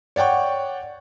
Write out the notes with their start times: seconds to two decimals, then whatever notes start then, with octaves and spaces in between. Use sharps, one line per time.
0.16 C#5 D5 F#5 G5 C#6